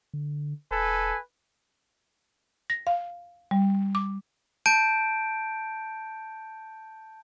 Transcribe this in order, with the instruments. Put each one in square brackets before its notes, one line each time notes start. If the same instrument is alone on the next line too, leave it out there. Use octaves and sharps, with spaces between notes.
[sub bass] D3
[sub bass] E1 [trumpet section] A4 B4 G#5
[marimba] A#6
F5
G3
D6
[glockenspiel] A5 G6 D7